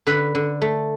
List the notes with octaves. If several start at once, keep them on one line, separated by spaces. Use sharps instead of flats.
D3 B4
D3
A3